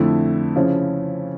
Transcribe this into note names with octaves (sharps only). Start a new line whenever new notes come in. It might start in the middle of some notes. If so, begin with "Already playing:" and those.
Already playing: F2 D3 A3 E4
C#3 F3 C#4 E4